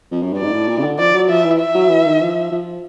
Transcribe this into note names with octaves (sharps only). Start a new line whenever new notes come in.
F2
F#2
G2 D5
G#2
A2
A#2
C#3
D3
F3 D5
F#3
F3 E5
E3
E5
F#3
E3
D#3
F3
F3